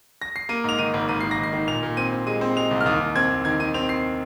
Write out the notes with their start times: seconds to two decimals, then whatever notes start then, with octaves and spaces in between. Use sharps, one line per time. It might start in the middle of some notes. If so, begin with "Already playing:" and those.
0.22 A#6
0.36 C7
0.49 A#3 D#7
0.64 G#2 F7
0.79 D#3 D#7
0.94 G#1
1.09 G#1 D#7
1.21 D#3 C7
1.31 A#6
1.38 G#1
1.43 C7
1.53 D#3
1.68 A#2 F7
1.83 A#2
1.97 C4 D#7
2.12 C4
2.27 G#3 D#7
2.41 C4
2.56 G#3 F7
2.71 C2
2.81 F6
2.86 D#2 D#6
3.01 D#2
3.16 C4 G#6
3.30 D#2
3.45 D#3 G#6
3.60 D#3 D#7
3.74 C4 F7
3.89 C4 C7